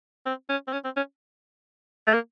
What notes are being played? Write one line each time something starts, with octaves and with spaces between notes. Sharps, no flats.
C4
C#4
C4
C#4
C4
C#4
A3
A#3